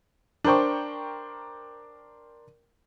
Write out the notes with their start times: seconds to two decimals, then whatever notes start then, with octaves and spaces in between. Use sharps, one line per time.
0.44 D4 A#4 C5 G5 C#6